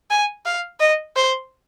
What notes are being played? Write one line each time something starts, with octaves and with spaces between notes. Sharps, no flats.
G#5
F5
D#5
C5